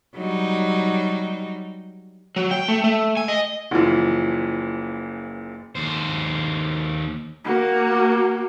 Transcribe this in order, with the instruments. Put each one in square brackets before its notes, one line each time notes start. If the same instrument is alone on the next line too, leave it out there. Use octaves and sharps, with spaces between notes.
[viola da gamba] F#3 G3 D#4
[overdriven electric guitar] F#3
G5
A3
A3
G#5
D#5
[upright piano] F#1 E3 F3
[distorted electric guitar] D#2 C5
[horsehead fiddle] A#3 F#4